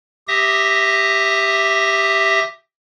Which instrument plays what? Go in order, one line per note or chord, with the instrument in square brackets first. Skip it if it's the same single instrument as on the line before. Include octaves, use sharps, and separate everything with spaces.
[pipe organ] G4 E5 D#6 A#6